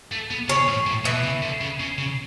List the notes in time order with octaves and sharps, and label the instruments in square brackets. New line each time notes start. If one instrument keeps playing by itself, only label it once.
[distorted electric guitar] A3
B3
[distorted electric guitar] C#3 [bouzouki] C#4
[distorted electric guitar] A2
A2
[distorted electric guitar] B2 [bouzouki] E3
[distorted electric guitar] C#3
D3
C#3
C#3
C#3